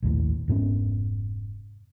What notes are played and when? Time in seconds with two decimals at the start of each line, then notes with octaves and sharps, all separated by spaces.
0.03 A#1 D#2 A2
0.48 F1 G#2 B3 C#4